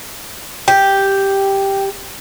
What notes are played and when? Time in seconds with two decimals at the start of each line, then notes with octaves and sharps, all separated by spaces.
0.68 G4 G5